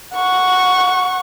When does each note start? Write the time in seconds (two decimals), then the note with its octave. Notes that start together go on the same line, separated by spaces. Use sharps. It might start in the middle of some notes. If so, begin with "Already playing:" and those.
0.15 F#5 C#6